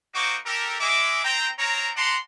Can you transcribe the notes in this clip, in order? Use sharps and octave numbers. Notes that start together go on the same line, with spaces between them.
A#3 D#4 F#4 C5 C#6 D6
G4 A4 A#4
G#3 E5 D6
C4 G5 A#5
C4 A#4 C#5 A#5
D5 F#5 A5 A#5 C6